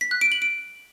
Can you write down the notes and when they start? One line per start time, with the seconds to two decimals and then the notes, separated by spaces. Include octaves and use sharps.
0.01 B6
0.11 F#6
0.21 D7
0.32 F#7
0.42 D7